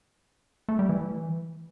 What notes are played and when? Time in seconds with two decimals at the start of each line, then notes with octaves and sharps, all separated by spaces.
0.69 A3
0.79 G3
0.89 E3